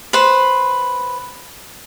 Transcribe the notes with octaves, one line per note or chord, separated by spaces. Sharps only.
B4 C5